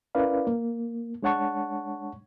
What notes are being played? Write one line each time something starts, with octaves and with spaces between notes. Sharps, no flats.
C#4 E4 A#4 B4 D5 F5
A#3
G#3 D4 C#5 F#5 A5 C#6